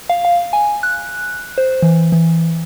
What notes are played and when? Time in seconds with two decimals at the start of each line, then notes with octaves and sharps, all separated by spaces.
0.10 F5
0.25 F5
0.53 G#5
0.83 F#6
1.58 C5
1.82 E3
2.12 E3